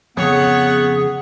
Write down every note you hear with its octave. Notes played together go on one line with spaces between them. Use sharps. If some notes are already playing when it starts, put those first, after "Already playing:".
F2 A#2 C#3 B3 G#4 C#5 F#5